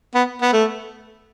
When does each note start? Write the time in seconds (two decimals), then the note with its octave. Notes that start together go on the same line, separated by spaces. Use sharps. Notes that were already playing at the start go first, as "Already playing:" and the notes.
0.15 B3
0.42 B3
0.53 A3